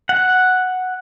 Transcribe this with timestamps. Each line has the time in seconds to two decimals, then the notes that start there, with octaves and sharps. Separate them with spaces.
0.09 F#5